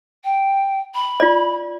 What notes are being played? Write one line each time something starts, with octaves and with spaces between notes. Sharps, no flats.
G5
B5
F4 D5